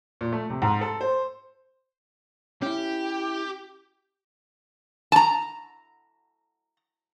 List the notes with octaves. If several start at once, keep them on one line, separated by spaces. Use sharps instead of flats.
A#2
A3
C3
G#2
A4
C5
C#4 E4 G4
A5 A#5